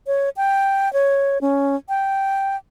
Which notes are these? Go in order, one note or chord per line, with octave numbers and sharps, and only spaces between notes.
C#5
G5
C#5
C#4
G5